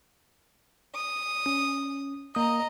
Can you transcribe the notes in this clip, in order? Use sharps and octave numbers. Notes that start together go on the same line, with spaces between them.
D#6
C#4
A#3 D#5 A#5 D#6